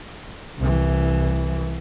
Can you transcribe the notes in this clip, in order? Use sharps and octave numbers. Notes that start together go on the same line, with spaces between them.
C2 E3